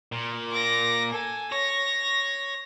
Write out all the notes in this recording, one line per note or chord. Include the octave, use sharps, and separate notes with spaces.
A#2
D6 A#6
A4 G#5
C#5 A#6